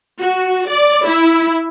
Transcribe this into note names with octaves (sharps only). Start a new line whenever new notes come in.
F#4
D5
E4